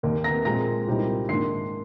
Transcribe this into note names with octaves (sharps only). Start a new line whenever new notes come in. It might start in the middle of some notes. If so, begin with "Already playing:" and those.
D#2 D#3 A#3
A#5 A#6
A#2 G#3 C4 A#5 A#6
C2 A#2 G3 C4 D#4
G#2 D#3 A#3 D4 C6 C7